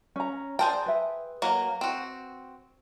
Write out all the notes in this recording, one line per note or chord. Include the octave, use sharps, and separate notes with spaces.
C#4 A#5
G#4 C5 D5 G5 A5 A#5
B4 E5
F#3 A#3
C4 F#4